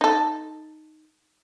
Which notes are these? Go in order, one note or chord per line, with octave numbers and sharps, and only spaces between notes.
D#4 A4